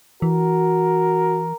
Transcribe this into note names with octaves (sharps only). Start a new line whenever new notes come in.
E3 F#4 A#4